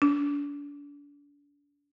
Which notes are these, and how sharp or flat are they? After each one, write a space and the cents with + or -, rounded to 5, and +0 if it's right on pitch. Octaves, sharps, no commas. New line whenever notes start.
D4 -35